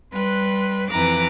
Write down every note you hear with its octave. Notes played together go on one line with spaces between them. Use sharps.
G3 B4 C6 F#6
F2 E3 B4 A#5 D6 F#6